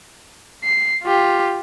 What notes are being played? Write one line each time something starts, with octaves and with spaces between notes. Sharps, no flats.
C7
F4 G4